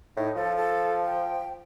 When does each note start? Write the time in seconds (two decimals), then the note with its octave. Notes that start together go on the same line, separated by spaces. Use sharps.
0.17 A2 D#4
0.36 F3 A4
0.57 A4
1.06 G5